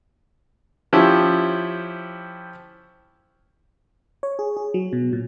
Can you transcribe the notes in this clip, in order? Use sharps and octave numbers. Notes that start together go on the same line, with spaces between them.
F3 C#4 E4 G4
C#5
G#4
G#4
F#3
B2
A#2